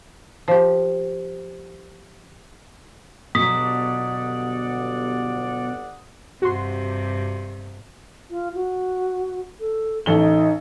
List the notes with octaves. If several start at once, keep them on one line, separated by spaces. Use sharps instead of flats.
F3 G4
G1 B2 F#3 D5 F#5 D#6 B6
G2 C3 F#4 C6
F4
F#4
A4
A1 D#4 A4 G7